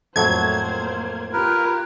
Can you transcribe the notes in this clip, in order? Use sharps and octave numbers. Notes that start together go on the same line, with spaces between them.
F2 A2 F#3 A#3 C5 G#6
F4 G4 A#4 B4